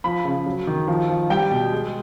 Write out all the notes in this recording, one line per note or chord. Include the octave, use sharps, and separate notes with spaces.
F3 B5
C#3
F#3
D#3
F3
F3
G3 G5
B2
G#3